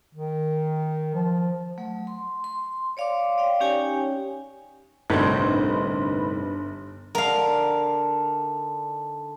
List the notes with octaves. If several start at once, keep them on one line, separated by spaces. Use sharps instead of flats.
D#3
F3
F#3 A3
C6
C6
C#5 D5 F5 C6 D6
D5 F5 G5
C#4 D#4 G4 C#5 G5 G#5
G1 C2 A2 D#4 B4 B5 C6
D3 D#4 A#4 F5